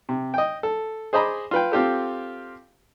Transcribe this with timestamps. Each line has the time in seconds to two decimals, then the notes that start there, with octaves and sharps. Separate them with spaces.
0.09 C3
0.34 D#5 G5
0.63 A4
1.13 G#4 C5 D#5 A#5 B5 D6
1.51 F4 B4 G5
1.72 C4 F4 G4 A4